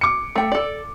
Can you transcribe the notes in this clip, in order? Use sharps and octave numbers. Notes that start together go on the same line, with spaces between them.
D6 C#7
A3 G5
A4 D5